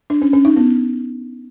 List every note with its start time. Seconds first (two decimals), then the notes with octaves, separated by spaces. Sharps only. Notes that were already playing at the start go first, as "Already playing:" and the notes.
0.10 D4
0.22 C#4
0.33 C#4
0.45 D#4
0.56 B3